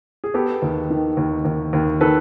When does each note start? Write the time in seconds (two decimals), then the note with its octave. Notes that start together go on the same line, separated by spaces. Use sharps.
0.24 G#4
0.34 B3 G4 A4
0.62 D#2
0.90 D#3
1.17 D#2
1.45 D#2
1.73 D#2
2.01 D#3 A4 B4